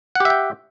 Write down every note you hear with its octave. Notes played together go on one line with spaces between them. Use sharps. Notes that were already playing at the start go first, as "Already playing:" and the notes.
G4 E5 F#5 G5